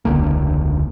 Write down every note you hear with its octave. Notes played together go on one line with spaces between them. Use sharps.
E1 C#2 D3 A#3